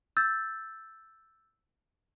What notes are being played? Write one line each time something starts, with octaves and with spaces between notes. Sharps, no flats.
E6 G6 A6